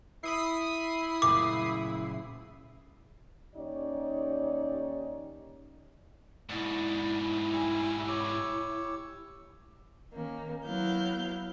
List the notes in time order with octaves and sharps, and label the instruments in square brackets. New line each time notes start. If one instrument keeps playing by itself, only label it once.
[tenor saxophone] E4 [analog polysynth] B5 D#6 C7
[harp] F#1 A#2 A3 [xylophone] D6
[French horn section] D#2 C#4 D#4 G4 C#5 D5
[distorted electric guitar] G#2 B2 [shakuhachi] E4 [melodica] D5
[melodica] G3 G#5 E6
G4 C#5 E6
[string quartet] D#3 A#3 C#4
F#3 B3 E4 F5 G6